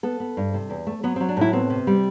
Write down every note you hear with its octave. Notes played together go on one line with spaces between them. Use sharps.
B3 A4
B3
G2
C3
E2
A3
F#3 B3
C4
F#3
D4
A2 E4
B3 C4
C3
G3